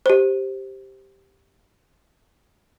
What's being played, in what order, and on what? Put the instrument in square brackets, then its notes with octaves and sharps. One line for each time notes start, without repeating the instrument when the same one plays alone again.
[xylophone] G4 C5